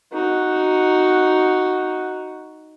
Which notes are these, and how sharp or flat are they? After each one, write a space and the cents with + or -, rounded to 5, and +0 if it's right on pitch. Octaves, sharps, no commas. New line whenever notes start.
D#4 +0 F#4 +0